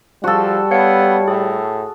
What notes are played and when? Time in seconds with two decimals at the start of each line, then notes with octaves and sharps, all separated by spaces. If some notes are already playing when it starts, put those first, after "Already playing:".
0.24 F3 G3 F#4 A4
0.71 B3 C#5 F5 C#7
1.28 A2 G#4